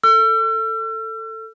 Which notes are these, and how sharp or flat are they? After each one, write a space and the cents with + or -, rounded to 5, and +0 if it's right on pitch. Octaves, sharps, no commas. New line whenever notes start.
A4 +15 E6 +45